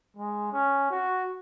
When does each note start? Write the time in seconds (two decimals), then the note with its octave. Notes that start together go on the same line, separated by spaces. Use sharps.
0.17 G#3
0.52 C#4
0.90 F#4